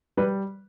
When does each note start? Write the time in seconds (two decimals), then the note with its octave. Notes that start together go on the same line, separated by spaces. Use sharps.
0.17 G3 B4